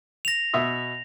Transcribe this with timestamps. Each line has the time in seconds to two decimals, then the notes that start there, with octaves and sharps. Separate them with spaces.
0.25 A#6 F7
0.54 B2 E5 D#6